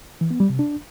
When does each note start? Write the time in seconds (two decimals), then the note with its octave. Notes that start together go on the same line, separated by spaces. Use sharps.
0.21 E3
0.31 B3
0.40 G3
0.50 C3
0.59 D4